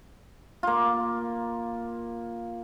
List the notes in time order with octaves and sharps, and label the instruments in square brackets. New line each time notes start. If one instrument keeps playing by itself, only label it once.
[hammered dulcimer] A#3 F4